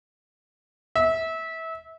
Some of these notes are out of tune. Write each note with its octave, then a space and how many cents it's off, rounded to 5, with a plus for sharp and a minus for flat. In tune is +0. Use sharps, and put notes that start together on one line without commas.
E5 -25